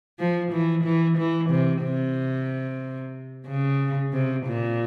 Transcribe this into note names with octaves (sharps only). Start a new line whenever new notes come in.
F3
E3
E3
E3
C3
C3
C#3
C3
A#2